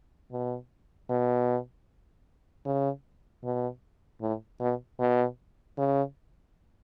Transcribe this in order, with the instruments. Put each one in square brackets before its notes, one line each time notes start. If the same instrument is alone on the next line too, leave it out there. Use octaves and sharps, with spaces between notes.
[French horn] B2
B2
C#3
B2
A2
B2
B2
C#3